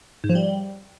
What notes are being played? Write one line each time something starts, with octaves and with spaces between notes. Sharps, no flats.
G#2
F3
G3